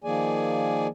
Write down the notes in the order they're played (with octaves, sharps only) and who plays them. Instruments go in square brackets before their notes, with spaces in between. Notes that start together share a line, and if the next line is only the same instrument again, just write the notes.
[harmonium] D#3 F3 A#3 G#4 D5 G#5